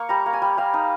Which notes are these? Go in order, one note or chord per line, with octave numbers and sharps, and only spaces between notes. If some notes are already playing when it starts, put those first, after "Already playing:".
Already playing: A#3 C#6
G3 A#5
A#3
G#5
G3
G3 F5
D#4